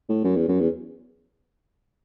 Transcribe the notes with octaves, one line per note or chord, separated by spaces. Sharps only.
A2
F#2
E2
F#2
E2